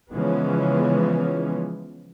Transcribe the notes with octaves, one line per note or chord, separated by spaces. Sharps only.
C#3 E3 F3 G#3 B3 C#4